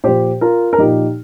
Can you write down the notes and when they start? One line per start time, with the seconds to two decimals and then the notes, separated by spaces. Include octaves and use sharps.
0.04 A#2 F3 G4 C5
0.41 F4 A#4
0.73 A#4
0.78 A#2 F3 D#4 G4